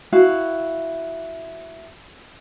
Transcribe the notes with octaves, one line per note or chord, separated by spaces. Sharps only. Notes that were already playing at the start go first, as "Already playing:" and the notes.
E4 F#4 F5